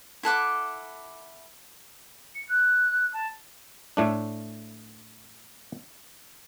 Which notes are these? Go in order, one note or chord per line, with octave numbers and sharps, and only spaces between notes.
E4 A4 F#5 D6
C#7
F#6
A5
A2 A3 D4